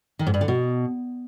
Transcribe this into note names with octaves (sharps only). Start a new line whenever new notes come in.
D#3
G#2
G2
D3
B2